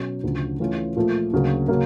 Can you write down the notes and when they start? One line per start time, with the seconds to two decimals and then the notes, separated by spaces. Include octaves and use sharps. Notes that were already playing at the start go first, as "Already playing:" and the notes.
Already playing: B2 F#3 C#4
0.23 D2 C#3 F3
0.60 E3 A3 C#4 F4
0.96 A#2 F3 A3
1.33 D2 C#3 F#3 A#3
1.68 C#3 F#3 A#3